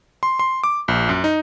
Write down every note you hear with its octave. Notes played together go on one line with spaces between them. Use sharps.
C6
C6
D6
A#1
F#2
D#4